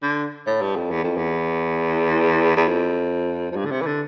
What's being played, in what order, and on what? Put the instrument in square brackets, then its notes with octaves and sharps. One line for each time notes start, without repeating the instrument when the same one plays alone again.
[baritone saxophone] D3
A2
G2
F2
E2
F2
E2
E2
F2
F2
G2
D3
C3
E3
D3